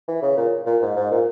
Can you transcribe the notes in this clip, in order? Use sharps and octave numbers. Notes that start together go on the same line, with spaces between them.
E3
C#3
A#2
A#2
G#2
G#2
A#2